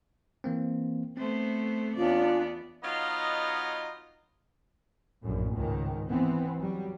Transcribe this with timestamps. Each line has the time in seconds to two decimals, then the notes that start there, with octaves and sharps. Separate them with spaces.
0.44 E3 A#3 C4
1.17 A3 B3 C4 C5
1.96 E2 B3 C#4 D4 F4 D5
2.84 F#3 B3 D#4 F4 D#5
5.22 A#1 F#2 A2
5.53 C#2 G#2 D#3
6.10 E3 B3 C4
6.60 F#3 G3